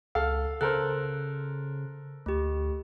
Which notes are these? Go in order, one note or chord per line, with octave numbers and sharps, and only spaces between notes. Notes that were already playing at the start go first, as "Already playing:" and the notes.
C#2 A4 F5
C#3 A4 A#4 C5 F#6
D2 A3 G4